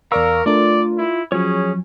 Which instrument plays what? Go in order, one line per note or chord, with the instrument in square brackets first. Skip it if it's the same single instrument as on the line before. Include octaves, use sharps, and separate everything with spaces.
[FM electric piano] E2 D5 C#6 [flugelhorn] A#4 [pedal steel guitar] F5 A#5 E6
[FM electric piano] A3 D4 A#4 [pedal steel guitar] F4 [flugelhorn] D5
[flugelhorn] E4
[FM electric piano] F3 F#3 [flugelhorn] C#4 [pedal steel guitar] G#4 C#5